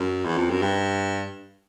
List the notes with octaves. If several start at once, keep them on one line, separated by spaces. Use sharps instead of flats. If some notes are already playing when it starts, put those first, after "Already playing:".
Already playing: F#2
E2
F2
F#2
G2